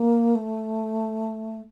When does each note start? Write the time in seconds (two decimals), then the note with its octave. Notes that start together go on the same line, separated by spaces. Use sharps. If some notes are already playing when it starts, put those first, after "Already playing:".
Already playing: A#3
0.35 A3